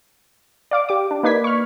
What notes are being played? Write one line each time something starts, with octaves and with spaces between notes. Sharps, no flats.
D5 F5 D6
G4 D6
D4
A#3 D#4 B4 D5 G#6 B6
C#6 F6